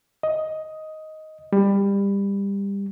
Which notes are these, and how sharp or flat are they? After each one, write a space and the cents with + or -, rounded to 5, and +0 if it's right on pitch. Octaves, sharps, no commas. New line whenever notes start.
D#5 +10
G3 +20